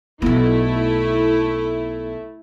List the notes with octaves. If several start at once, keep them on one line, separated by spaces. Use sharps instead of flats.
B1 A3 B3 E4